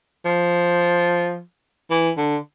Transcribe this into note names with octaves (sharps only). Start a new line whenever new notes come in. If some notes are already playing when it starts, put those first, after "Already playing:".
F3
E3
D3